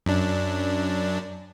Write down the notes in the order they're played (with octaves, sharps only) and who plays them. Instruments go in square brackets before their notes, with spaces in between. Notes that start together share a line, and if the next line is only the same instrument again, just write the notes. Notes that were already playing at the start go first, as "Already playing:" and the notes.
[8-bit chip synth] F#2 D4